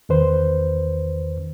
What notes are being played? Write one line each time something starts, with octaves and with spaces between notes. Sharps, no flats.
E2 D#3 B4 C5